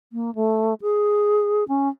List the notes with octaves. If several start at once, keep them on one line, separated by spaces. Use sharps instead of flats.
A#3
A3
G#4
C#4